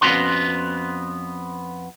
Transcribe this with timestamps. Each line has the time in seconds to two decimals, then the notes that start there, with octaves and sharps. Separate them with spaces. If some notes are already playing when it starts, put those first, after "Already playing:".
0.01 F2 B3 C#4 F4 F#4 C6